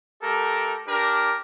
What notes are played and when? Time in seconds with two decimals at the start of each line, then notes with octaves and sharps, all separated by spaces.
0.22 A3 G4 A4 A#4
0.86 D4 G4 A#4